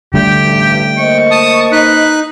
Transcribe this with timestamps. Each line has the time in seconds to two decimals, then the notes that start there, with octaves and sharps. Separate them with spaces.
0.14 D3 G3 A3 G4 G5
0.45 A1 G2
0.97 A#3 C5 D#5 C#6
1.31 A5 D#6
1.72 D#4 B4 F#6